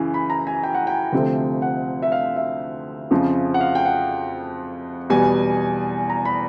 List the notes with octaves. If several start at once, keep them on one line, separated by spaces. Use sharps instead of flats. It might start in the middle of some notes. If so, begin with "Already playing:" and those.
Already playing: F#2 C#3 E3
B5
A#5
G#5
G5
F#5
G5
D2 C3 F3 A3
F#5
E5
F5
E5
F2 C#3 F3
F#5
F5
G5
F#5
E2 B2 G3 G#5
A#5
B5